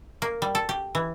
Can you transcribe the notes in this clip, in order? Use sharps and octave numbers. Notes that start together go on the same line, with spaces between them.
A#3
G3
A4
G4
E3